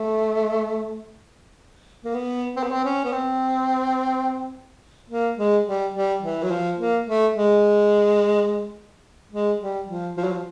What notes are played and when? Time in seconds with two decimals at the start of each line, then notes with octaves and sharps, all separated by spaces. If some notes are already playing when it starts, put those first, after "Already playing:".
Already playing: A3
2.05 A#3
2.14 B3
2.56 C4
2.63 B3
2.71 C4
2.85 C#4
3.04 B3
3.13 C4
5.10 A#3
5.38 G#3
5.66 G3
5.94 G3
6.22 E3
6.43 F#3
6.51 F3
6.79 A#3
7.07 A3
7.35 G#3
9.32 G#3
9.61 G3
9.89 F3
10.17 F3
10.24 F#3
10.32 F3